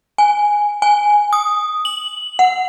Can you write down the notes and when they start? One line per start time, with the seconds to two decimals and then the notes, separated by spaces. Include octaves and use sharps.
0.18 G#5
0.82 G#5
1.33 D#6
1.85 F#7
2.39 F#5